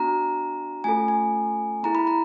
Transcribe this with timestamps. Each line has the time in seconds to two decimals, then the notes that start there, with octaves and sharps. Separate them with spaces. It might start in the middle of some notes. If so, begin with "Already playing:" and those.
Already playing: B3 D4 F#4 A#5
0.84 A3 C#4 F4 A4 G#5
1.08 G#5
1.83 B3 E4 G#4 A#5
1.95 B5
2.07 A#5